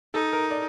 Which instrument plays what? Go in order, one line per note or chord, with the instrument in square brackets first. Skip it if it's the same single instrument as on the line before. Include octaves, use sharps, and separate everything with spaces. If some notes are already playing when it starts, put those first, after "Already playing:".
[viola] D#4 [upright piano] A4
[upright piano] A#4
D5